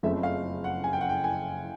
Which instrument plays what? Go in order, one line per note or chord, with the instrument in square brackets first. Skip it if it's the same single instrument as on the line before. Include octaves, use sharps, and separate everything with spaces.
[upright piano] F#1 F2 C#3 F3 A3 [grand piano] E5
[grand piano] F5
F#5
G#5
G5
F#5
G5
G#5